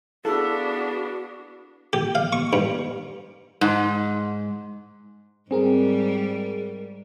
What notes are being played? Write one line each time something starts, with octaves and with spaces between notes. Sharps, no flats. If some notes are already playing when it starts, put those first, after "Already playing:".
B3 D4 E4 F#4 G#4 A4 F5
G4
F5
C#6
G2
G#2
G#2 G3 C4 G#4 A#4